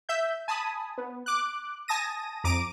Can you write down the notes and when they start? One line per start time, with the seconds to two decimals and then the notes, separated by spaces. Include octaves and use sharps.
0.09 E5 G6
0.48 G#5 A5 B5 D#6
0.98 B3
1.26 D6 F#6
1.88 G#5 A5 D#6 A#6 D#7
2.44 F2 A#5 D6 D7 D#7